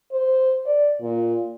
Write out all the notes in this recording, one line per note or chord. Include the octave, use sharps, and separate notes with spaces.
C5
D5
A#2